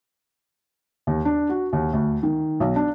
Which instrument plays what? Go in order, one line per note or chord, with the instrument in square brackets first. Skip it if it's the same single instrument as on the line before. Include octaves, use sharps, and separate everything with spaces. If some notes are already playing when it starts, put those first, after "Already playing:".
[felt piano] D#2
D4
F#4
D#2
D2
D#3
B1
D4